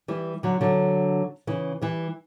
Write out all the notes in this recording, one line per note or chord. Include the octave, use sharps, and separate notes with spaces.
E3 G3
D3 F#3
D3 F#3
C#3 E3
E3 G3